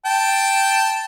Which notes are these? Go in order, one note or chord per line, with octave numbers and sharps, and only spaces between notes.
G5 A5